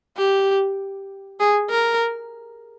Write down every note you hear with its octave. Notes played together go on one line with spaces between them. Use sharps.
G4
G#4
A#4